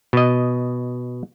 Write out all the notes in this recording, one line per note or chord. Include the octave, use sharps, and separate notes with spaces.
B2 D#5